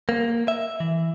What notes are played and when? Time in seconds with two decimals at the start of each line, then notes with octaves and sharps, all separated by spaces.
0.09 A#3
0.48 E5
0.80 E3